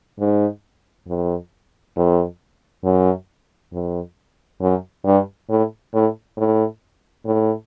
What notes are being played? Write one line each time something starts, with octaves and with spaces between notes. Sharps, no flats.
G#2
F2
F2
F#2
F2
F#2
G2
A2
A2
A2
A2